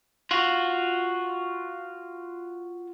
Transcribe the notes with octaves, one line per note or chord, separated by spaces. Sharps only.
F4 F#4